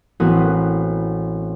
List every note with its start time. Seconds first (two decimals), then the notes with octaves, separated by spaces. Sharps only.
0.20 A1 B3 C4 F#4 D#6